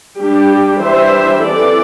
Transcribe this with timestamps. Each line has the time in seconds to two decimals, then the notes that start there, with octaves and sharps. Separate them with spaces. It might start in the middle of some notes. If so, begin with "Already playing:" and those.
0.19 G3 D4 G4
0.81 E3 G3 D4 C5 E5
1.42 E3 C4 A4 D5